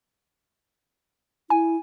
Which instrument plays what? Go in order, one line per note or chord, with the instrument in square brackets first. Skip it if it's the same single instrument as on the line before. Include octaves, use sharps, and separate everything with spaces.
[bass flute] E4 [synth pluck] G#5